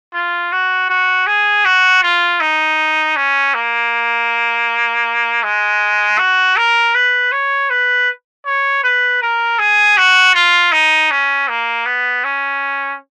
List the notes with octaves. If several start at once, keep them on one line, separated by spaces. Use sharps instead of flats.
F4
F#4
F#4
G#4
F#4
F4
D#4
C#4
A#3
G#3
F#4
A#4
B4
C#5
B4
C#5
B4
A#4
G#4
F#4
F4
D#4
C#4
A#3
B3
C#4